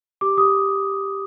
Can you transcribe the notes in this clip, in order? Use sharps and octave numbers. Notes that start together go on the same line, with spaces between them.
G4 D6
G4 D#6